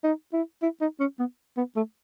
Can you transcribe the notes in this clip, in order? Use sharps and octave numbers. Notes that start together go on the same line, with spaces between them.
D#4
E4
E4
D#4
C#4
B3
B3
A3